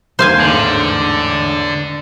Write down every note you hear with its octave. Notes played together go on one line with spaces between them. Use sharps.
D#2 D#3 C5 F5 G#5
A1 E2 G#2 D3